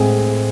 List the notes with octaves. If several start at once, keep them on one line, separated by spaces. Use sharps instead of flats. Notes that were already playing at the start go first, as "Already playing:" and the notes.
Already playing: A2 G#3 C4 G#4 C5